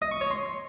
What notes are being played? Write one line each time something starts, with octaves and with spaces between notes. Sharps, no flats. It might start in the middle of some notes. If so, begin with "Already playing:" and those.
D#5
C#6
C#5
C6